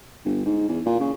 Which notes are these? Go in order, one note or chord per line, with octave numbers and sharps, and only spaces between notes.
G1
G#2
E2
A#2
C#3